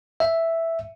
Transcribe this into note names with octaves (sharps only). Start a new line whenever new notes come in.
E5